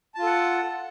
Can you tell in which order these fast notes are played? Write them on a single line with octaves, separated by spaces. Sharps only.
A5 F4 A4 F#5